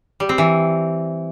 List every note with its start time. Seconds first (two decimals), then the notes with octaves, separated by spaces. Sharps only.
0.20 G3
0.29 C4
0.38 E3